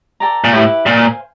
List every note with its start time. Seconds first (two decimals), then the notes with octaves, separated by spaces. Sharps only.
0.20 A4 D5 G5 A#5
0.44 A#2
0.53 A2 E4 G4 B4 E5
0.86 A#2 C5 F5 G#5 C6